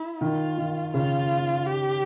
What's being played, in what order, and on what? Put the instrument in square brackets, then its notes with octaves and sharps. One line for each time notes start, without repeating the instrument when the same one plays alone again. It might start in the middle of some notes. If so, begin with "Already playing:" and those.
Already playing: [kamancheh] E4
[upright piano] D#3 [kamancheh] F4
[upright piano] D#3
[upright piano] C#3 [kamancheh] F4
[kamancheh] G4